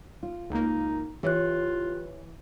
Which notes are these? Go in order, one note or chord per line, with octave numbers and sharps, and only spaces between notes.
F4
C#2 A#3 D#4
E3 F4 G4 C#5 F#6